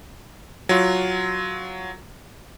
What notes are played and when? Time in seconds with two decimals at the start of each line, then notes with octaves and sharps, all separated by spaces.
0.69 F#3 F4